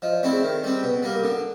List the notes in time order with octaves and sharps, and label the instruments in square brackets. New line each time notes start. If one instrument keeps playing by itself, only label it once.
[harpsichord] F3 [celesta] D#5
[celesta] D5
[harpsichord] A3 C4 E4 [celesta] A4
[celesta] G#4
[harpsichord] D#3
G3 C4
B2
G3 A#3
[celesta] A#4
[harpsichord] D3 [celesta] A4